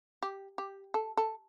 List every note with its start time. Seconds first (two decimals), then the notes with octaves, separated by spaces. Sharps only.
0.23 G4
0.58 G4
0.94 A4
1.17 A4